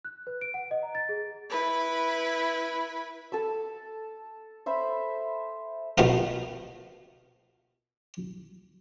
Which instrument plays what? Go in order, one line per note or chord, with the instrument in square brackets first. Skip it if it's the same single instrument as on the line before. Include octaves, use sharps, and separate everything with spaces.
[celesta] F#6
B4
D7
F#5
D#5
A#5
A6
G#4
[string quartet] E4 B4 B5
[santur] A4 A5 E6
C5 E5 B5
[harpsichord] B2 A3 B3 C4 F4 A#4